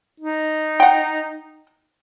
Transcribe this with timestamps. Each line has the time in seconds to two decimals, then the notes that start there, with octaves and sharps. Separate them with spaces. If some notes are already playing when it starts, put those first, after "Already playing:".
0.20 D#4
0.80 F#5 G5